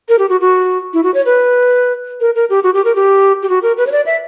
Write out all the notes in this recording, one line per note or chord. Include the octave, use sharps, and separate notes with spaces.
A#4
G4
F#4
F#4
E4
F#4
C#5
B4
A#4
A#4
G4
F#4
G4
A#4
G4
G4
F#4
A#4
B4
C#5
D5
E5